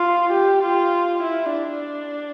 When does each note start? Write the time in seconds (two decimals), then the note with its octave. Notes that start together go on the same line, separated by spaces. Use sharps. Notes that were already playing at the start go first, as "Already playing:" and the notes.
Already playing: F4
0.32 G4
0.63 F4
1.23 E4
1.53 D4